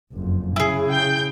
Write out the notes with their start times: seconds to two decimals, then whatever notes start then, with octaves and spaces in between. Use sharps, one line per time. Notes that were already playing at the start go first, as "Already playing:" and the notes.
0.12 F#1 F2
0.56 C#3 E4 G#4
0.91 G5 G6